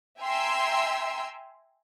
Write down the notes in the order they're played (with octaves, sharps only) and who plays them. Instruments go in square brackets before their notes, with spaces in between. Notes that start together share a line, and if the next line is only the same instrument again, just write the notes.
[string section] E5 G5 G#5 A#5 C6 E6